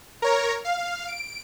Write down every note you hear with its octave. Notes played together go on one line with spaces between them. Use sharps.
A#4 C#5 A#5
F5
D7